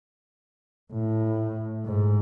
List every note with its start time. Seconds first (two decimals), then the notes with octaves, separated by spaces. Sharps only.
0.93 A2
1.86 G#2